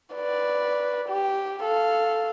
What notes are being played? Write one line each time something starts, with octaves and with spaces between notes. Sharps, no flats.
B4 D5
G4
A4 F5